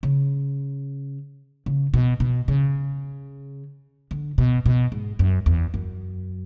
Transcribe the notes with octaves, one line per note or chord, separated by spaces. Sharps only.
C#3
C#3
B2
B2
C#3
D3
B2
B2
G#2
F#2
E2
F#2